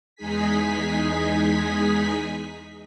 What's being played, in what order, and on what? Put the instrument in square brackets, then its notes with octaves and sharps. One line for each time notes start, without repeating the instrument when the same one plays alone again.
[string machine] E2 G#3 D#4 G#4 G#5 B6